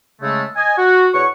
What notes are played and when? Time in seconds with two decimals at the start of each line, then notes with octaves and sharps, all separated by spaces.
0.21 C#3 G#3 A3
0.57 D#5 G#5
0.78 F#4
1.14 E2 C#5 F#5 C#6